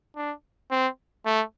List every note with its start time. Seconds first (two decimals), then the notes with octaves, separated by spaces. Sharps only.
0.16 D4
0.71 C4
1.26 A3